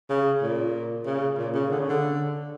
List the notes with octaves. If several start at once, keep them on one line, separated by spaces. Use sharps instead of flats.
C#3
A#2
C#3
A#2
C#3
D3
C#3
D3